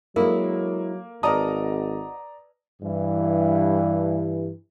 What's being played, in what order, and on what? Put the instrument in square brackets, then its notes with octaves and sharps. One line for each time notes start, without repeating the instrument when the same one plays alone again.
[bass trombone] F#3 [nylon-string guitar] G#3 D4 E4 [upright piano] A#3 [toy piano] A4 A#4
[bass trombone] G#1 [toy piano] B4 A5 [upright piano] D5 A#5 D#6 [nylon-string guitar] D#5 F#5
[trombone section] G2 E3